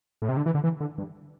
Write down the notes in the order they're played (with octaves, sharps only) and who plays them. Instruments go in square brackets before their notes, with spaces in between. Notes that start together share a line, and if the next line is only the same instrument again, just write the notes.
[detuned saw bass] A2
C3
D3
E3
D3
E3
D3
G2